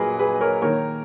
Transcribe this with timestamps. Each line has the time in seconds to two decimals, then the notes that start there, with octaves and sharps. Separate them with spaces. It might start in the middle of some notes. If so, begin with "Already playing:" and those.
Already playing: A#2 F#3 A#3 G#4 B4 D#5
0.19 G#4 B4
0.41 A#4 C#5
0.62 D#3 A#3 A#4 C#5